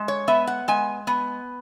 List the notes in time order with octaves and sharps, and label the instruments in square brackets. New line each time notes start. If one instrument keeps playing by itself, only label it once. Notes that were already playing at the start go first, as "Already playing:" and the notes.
Already playing: [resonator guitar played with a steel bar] G#3
C#5
B3 E5
F#5
G#3 G#5
B3